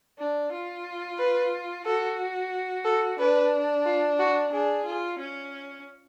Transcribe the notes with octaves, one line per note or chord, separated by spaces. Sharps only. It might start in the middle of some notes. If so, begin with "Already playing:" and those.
D4
F4
B4
F#4 A4
A4
D4 B4
F4
F#4
D4 G#4
F4
C#4